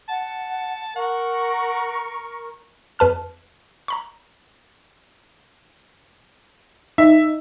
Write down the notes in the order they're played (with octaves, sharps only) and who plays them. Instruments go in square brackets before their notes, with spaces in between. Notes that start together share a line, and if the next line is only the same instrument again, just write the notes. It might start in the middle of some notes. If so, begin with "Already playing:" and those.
[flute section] F#5 [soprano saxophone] A5
[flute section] A#4 C#6 [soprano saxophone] F#5
[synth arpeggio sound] F2 B4 A5 F6
A#5 B5 C#6
[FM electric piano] D#4 [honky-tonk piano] E5